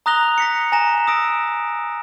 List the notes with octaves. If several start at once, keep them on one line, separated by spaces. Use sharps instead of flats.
A#5 D#6 F#6 A#6 F7 G7
A#6 B6 C#7
G#5 A#5 A#6 E7
D#6 E6 A#6 D7